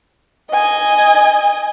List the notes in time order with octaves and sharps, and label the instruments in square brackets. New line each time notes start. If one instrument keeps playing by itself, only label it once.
[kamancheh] D#5 G#5